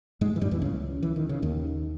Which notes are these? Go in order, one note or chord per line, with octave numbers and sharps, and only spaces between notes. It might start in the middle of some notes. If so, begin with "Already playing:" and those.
G#2 G#3
E3
G2 G3
E2 E3
C#2 C#3
E3
D#3
C#3
D#2 D#3